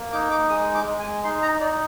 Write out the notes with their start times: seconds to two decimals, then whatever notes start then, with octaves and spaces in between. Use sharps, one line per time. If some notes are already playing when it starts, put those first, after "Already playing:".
Already playing: A#3
0.12 D#4 D6
0.31 D6
0.50 G#3 D#6
0.75 D6
0.87 G#3
0.99 G#5
1.24 D#4 C6
1.42 A#5
1.60 D#4 D5